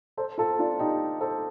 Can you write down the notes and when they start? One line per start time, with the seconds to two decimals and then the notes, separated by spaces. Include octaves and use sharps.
0.17 A4 C5
0.38 F4 A4
0.59 D4 F4
0.79 D#4 G4
1.21 A4 C5